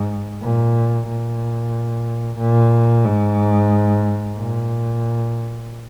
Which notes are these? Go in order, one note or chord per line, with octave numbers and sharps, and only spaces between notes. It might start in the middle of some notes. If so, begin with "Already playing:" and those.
Already playing: G#2
A#2
A#2
A#2
G#2
A#2